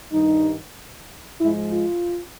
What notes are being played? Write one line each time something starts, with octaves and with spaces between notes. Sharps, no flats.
G2 D#3 G3 D#4
G#2 F3 G#3 E4
F4